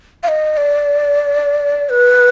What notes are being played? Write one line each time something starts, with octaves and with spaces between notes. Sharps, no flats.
F5
D#5
D5
B4